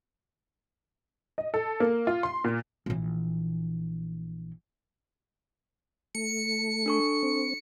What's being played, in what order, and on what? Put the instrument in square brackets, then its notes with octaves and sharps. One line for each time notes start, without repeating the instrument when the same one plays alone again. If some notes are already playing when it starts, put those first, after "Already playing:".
[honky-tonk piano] D#5
A4
A#3
F4
C6
A#2
[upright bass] A#1 E3
[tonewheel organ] A3 [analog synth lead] C#7
[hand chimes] D4 A4 C#6
[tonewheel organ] C4